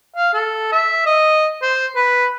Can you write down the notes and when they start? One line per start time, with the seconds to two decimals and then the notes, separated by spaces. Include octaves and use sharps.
0.16 F5
0.34 A4
0.72 E5
1.06 D#5
1.62 C5
1.95 B4